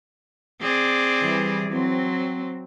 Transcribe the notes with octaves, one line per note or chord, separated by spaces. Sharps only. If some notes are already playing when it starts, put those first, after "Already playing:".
C4 G#4 D5
E3 G3
F#3 C4